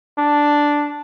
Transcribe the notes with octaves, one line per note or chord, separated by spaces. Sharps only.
D4